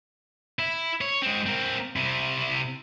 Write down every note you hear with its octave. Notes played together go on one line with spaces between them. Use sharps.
E4
C#5
G#3 C4
C4 A#4
C3 E4